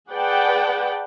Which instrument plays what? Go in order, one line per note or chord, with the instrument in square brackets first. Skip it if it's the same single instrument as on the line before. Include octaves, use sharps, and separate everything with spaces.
[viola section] G#4 B4 D5 F#5 G5 A5